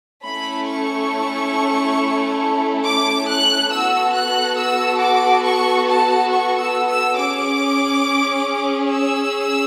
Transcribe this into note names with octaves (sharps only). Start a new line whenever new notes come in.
A3 C#4 E4 A4 B5
C#6
D6
F#6
B3 F#4 A4 E6
F#6
E6
D6
C#6
A5
C#6
E6
E6
C#4 G#4 D6
E6